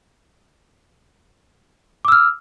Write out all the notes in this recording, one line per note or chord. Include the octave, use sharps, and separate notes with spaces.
D6 E6 F6